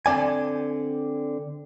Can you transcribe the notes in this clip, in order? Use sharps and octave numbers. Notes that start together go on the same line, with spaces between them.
D3 C4 D5 G#5